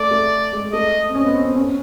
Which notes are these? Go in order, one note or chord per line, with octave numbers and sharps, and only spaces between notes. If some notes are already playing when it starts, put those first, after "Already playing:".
Already playing: A3 D5
A3
G#3
A3 D#5
C4
C#4 D#5
B3
C4
C#4